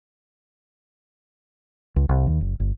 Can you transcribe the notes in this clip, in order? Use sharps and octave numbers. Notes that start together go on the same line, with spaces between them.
C#2
C2
D#2
F#1
G1